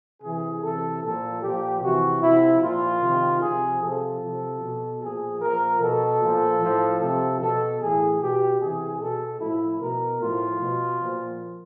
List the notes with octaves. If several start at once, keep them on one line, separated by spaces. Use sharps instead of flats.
C3 E3 G#4
C3 E3 A4
A#2 F3 A4
A#2 F3 G4
C3 E3 F#4
C3 F3 E4
A#2 F3 F4
C3 D#3
C3 F3 G#4
C3 F3 A4
C3 F3
B2
A#2 F3 G#4
A#2 F3 A#4
B2 A4
A#2 F3
A2 F3
C3 F3 A4
B2 A4
A2 E3 G#4
B2 G4
C3 E3 G#4
B2 A4
A2 F3 E4
B2 A#4
A2 F3 F4
B2
A#2 F3